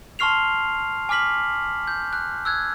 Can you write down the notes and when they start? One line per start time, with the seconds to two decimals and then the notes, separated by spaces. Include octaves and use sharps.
0.19 A5 C6 C#6 F6 C7 F7
1.09 G#5 D6 F6 B6 F#7
1.88 G6
2.13 F#6
2.45 E6 F#6 G#6